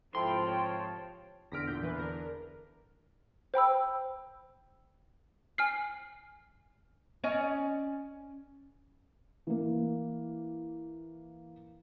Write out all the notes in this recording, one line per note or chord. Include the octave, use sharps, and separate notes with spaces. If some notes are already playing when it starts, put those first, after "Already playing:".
G#2 C3 F3 E4 A4 C5 G5 C6
C#5 G5 A5
E2 D3 F6 A#6 B6 D7
A#2 G6
E3 B4
D4 A#4
C5 G5 B5 E6
G#5 F6 C7
C#4 D5 D#5
E3 A#3